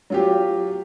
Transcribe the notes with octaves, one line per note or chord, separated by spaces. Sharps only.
F#3 F4 G4